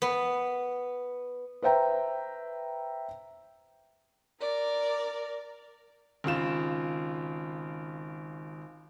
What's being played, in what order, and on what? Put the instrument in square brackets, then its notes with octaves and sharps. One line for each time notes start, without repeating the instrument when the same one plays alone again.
[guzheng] B3
[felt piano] B4 C5 E5 G5 A#5
[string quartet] A#4 D5
[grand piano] G#1 C#3 F4 E7